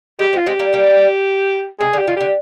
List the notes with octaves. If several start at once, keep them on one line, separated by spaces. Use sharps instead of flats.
G#3 G4
G#3 C4
F4
G#3 C4 G4
G3 A#3
G3 A#3
C3 G#4
D3
G4
D#3 F4
D3 G4